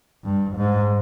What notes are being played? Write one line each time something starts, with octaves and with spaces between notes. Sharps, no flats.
G2
G#2